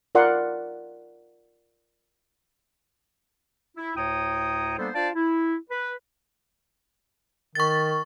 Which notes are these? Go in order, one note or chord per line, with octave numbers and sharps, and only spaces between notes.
F4 A#4 D5 F#5 C6
E4
D2 A2 C#5 G5 A#5 D#6
G3 A#3 B3 D4 A4 C5
D4 F4 C5 D5 F5 A5
E4
B4
D#3 C#6 A6